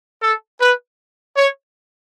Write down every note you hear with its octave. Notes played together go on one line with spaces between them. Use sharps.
A4
B4
C#5